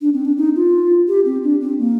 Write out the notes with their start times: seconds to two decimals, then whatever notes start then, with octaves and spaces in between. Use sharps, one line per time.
0.01 D4
0.14 C4
0.25 D4
0.37 D#4
0.56 F4
1.08 G4
1.25 C4
1.43 D4
1.61 C4
1.79 A#3